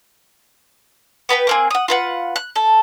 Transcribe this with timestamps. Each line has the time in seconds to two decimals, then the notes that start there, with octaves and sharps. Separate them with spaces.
1.29 B3 B4 G5 B5
1.47 A#3 C4 G#4
1.71 F#5 D#6
1.88 F4 B4 F#5
2.36 F#6
2.56 A4